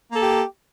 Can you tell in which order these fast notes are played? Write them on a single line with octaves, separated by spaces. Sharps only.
A#3 A4 G4